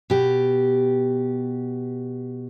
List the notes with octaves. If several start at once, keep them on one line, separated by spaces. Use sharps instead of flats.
B2 G4